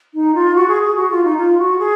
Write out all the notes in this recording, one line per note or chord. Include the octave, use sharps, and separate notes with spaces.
D#4
F4
F#4
G#4
G#4
F#4
F4
D#4
F4
F#4
G#4